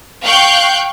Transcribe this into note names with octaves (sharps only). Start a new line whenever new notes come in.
F5 G5 C#6 F#6 G6